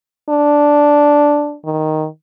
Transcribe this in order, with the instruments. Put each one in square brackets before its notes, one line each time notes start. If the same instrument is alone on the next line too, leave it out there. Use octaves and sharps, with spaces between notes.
[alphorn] D4
D#3